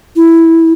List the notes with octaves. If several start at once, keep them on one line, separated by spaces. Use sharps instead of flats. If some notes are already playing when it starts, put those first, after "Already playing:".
E4